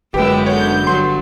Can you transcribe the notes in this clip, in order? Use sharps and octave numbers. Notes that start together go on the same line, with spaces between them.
G1 F#2 G#3 G4 B4 G5 E6
D3 B3 C#5 G6
G2 F#3 C6